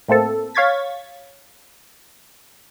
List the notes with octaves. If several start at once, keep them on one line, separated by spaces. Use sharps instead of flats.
A2 A3 A#3 C4 A4
C#5 F5 C#6 G#6 A6 B6